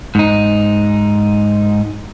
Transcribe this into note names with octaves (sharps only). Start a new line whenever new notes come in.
G#2 D#4